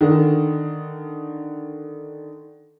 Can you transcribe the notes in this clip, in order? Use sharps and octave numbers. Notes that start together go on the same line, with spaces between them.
D3 D#3